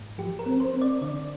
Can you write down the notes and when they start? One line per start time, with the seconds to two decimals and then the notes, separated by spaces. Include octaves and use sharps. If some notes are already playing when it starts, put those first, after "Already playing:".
Already playing: G#2
0.18 F3 G4
0.39 A#4
0.46 C4
0.60 C5
0.74 C4
0.81 D5
1.02 D3 D5